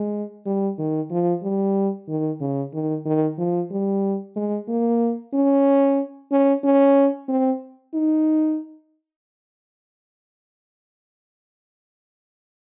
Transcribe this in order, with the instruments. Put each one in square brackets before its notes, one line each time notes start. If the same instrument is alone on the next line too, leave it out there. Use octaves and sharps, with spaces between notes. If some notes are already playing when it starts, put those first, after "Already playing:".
Already playing: [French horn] G#3
G3
D#3
F3
G3
D#3
C#3
D#3
D#3
F3
G3
G#3
A#3
C#4
C#4
C#4
C4
D#4